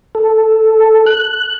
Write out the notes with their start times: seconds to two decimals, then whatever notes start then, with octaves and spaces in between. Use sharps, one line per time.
0.15 A4
1.06 F#6